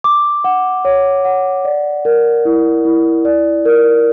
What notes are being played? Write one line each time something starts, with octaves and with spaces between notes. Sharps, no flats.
D6
F#5
C#5
F#5
D5
A#4
E4
E4
D5
A#4